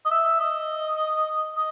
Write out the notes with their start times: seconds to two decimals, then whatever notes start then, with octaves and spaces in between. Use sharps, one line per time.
0.06 D#5
0.11 E5
0.40 D#5
1.56 D#5